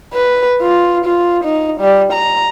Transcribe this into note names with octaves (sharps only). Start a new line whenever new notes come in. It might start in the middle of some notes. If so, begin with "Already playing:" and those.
B4
F4
F4
D#4
G3
A#5